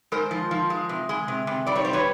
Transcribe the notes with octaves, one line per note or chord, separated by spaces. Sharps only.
G#3 A#4 C5
F3
F3
G#3
C3
G#3
C3
C3
G3 D5
C#5
G3 C5
B4 C#5